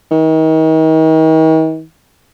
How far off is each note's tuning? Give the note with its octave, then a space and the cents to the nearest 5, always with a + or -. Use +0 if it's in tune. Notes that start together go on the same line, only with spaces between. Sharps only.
D#3 +40